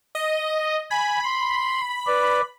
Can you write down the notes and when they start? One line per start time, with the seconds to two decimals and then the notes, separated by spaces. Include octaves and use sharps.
0.15 D#5
0.91 G#5 B5
1.24 C6
2.07 B4 D5